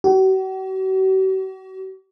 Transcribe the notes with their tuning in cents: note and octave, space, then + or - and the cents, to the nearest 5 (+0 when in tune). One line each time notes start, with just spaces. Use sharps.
F#4 +45